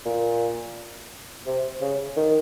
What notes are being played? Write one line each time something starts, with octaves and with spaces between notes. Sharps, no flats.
A#2
C3
C#3
D#3